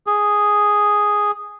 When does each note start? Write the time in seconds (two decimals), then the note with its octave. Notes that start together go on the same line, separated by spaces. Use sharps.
0.07 G#4